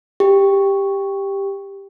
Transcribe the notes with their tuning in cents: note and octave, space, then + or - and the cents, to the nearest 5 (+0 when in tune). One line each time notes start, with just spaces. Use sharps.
G4 +10